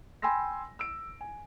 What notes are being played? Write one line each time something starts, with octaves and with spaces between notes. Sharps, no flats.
G5 G#5 B5 C6 E6 A#6
E6 D7
G#5